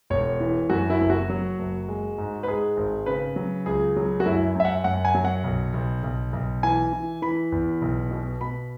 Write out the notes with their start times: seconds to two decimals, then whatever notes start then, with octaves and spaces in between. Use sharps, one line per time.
0.10 E1 C#5
0.40 E3
0.70 F#2 F#4
0.90 E4
1.00 F#1
1.10 F#4
1.30 F#3
1.59 F#1
1.88 G#3
2.18 G#2
2.43 B4
2.47 G#2 G#4
2.77 G#1
3.06 C#3 B4
3.36 F#3
3.66 C#2 G#4
3.96 F#3
4.20 F#4
4.25 F#2 E4
4.55 F#2 E5
4.65 F#5
4.84 F#2 F#5
5.05 G#5
5.15 F#3
5.25 F#5
5.44 B1
5.74 B1
6.04 B1
6.33 B1
6.63 E3 G#5
6.93 E3
7.22 E3 B5
7.52 E2
7.82 B1
8.11 B2
8.41 B2 B5